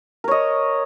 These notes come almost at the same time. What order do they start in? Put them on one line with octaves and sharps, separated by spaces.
A#4 C#5 D#5